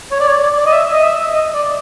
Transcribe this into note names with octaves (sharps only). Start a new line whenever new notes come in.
C#5
D5
C#5
D5
D5
D#5
E5
D#5
E5
D#5
D5